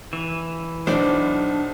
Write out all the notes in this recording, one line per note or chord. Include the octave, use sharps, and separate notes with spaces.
E3
B1 D4 C5 D5